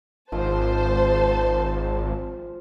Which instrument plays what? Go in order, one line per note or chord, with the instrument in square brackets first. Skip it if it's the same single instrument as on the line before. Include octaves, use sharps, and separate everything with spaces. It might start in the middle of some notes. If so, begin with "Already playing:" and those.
[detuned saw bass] G#1 [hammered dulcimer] F3 [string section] C5 A5